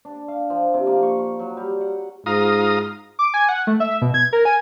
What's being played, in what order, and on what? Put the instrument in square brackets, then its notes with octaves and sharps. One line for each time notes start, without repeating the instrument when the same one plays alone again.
[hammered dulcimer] D4
F5
F3
C3
A#3
C#6
C#6
F#3
G3
F#5
[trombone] G#2 [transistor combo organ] F4 A#5 D#6
[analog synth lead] D6
G#5
F#5
A3
E5
B2
G#6
A#4
G#5